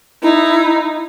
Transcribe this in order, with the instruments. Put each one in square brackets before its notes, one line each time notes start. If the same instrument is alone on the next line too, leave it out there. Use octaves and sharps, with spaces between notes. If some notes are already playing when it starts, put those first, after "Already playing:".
[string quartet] D#4 [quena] E4